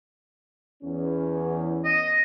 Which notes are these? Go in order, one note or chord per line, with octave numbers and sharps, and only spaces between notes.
E2 C#4
D#5